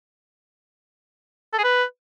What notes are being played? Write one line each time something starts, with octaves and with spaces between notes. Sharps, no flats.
A4
G#4
B4